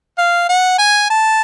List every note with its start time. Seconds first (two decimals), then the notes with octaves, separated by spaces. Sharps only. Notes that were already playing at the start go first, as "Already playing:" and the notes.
0.18 F5
0.49 F#5
0.79 G#5
1.10 A5